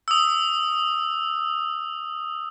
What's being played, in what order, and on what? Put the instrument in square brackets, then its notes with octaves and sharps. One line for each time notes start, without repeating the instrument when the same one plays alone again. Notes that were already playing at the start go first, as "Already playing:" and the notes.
[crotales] D#6 E6